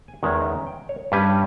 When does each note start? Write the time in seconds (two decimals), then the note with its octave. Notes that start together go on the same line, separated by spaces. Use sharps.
0.08 G#5
0.23 E2 D#3 G#3 C#4 G#5
0.41 D#5
0.44 E5
0.67 G5
0.89 C#5
1.12 G2 G3 C#4 B4